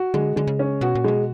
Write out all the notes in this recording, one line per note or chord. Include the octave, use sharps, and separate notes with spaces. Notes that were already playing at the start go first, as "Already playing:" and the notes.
Already playing: F#4
D3 G#3
D3 G#3
C#3
C#4
B2 F#4
A#2
B2 G#3